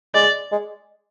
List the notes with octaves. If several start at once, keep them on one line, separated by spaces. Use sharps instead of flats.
G#3 D5
G#3